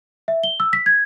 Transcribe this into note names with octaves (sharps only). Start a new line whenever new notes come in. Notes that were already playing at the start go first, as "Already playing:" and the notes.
E5
G7
E6
B6
G#6